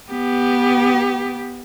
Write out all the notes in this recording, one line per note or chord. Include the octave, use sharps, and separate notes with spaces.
B3 G4